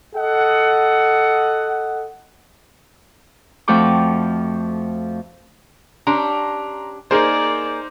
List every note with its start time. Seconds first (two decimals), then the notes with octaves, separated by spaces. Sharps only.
0.15 A4 D#5 F#5
3.68 F2 F3 A3 F#4 G5 D6
6.07 C#4 D4 G4 A#5 C6
7.11 A#3 D#4 G#4 A#4 C5 D5